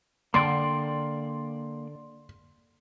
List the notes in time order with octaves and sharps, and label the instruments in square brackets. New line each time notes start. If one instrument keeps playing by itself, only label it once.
[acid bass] D3 [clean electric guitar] A#3 D5 G5 [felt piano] C6